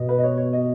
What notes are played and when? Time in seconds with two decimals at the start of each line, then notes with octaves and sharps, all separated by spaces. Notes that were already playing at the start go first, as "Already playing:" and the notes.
Already playing: B2 D#5
0.09 B4
0.19 D#5
0.23 C#5
0.38 C#5
0.53 D#5